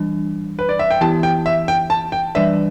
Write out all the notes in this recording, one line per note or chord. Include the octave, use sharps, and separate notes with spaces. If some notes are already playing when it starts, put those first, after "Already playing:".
Already playing: E3 G3 D4
B4
D5
E5
G5
E3 B3 E4 G4 A5
G5
E5
G5
A5
G5
E3 G3 D4 B4 D5 E5